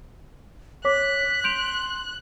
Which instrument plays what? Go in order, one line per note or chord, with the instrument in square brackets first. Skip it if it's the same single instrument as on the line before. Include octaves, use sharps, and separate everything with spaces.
[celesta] C#5 D6 [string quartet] F#6 [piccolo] B6
[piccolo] C6 [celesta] G6 D7 F7